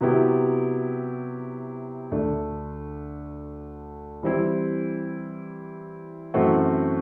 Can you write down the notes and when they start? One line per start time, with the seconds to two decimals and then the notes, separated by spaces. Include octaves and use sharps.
0.01 C3 F#3 B3 E4 G4
2.11 D2 D3 A3 D4
4.23 E3 G3 C4 E4
6.34 F#2 E3 A3 C4 F#4